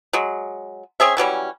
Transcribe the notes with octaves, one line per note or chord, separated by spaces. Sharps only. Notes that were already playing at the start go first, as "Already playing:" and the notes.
F#3 G#3
C4 C#4 G#4 E5
E3 F#3 G3 C#4